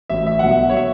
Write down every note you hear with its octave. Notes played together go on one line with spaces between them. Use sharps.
A1 A2 F#3 E5
E5
B1 B2 F#3 F#5
E5
C#5
B2 E5